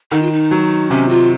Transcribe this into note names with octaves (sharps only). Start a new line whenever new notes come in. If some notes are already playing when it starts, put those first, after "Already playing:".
D#3 D#4
F4
D#4
F#3
C3 C#4
F4